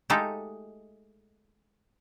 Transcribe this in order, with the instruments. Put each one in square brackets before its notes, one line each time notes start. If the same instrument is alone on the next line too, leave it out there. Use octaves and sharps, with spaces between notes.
[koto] G#3 A3 D#4 F4 G4 A4